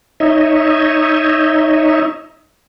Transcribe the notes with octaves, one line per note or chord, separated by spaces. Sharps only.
D#4 C#5 D#5 E5